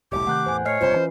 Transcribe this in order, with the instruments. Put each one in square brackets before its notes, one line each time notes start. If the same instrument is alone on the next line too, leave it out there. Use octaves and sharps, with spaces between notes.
[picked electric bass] E1 C2 A2 [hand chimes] G4 [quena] D6
[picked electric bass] C3 D#3 A3 [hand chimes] F#5 F#6 G6
[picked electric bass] E2 A2 [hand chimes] C5 G#5
[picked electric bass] A2 [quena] C#5 [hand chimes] D#5 F6 C7
[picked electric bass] F#1 G2 C3 [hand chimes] F4 [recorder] C5
[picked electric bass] E3 C#4 [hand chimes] B4